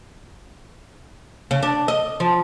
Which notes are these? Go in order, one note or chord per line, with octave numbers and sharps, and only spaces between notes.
C#3
D4
D#5
F3